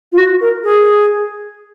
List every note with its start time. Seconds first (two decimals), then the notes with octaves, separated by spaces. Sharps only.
0.12 F4
0.18 F#4
0.41 A#4
0.64 G#4